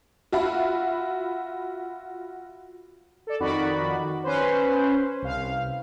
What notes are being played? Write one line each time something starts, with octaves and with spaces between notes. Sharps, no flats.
F4 F#4 E5 B5
A4 D5
F2 D#3 F#4 D5 B5
C#4 B4 C5
C2 F5